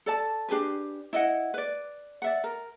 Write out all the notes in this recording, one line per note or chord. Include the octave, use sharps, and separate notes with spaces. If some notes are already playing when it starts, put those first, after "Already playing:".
A4 D5 A5
D4 G4 G#4 B4
E4 D#5 F5 F#5
B4 D5
D5 E5 F#5
A#4